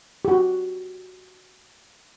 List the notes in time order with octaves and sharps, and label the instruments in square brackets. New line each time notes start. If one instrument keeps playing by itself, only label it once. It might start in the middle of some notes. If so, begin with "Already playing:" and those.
[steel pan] F#4 G4